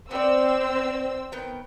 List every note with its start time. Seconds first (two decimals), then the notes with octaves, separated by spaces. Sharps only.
0.11 B3 C4 D5 E6
1.32 D#3 B3 G5